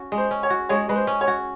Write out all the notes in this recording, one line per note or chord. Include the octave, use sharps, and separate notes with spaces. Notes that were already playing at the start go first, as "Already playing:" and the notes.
Already playing: C#4 F#4
G#3
C5
C#4
C#5
F#4
G#3 C#5
G#3 B4
C5
C#4
C#5
F#4